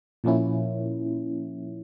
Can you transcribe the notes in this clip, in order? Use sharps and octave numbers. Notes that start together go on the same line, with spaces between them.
A#2 F3 A#3 C#4 E4